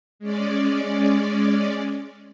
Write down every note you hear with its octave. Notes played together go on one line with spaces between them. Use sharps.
G#3 C#4 D5